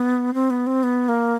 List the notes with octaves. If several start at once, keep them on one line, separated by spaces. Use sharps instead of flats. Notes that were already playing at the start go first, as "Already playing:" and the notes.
Already playing: B3
C4
B3
C4
B3
A#3